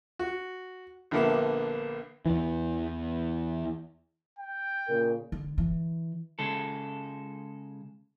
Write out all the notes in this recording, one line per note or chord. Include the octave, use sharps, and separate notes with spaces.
F#4
A#1 D3 A#3 B3 E5
E2 E3
G5
A#2 C#3 A#4
D3
E3
C#3 G#3 A4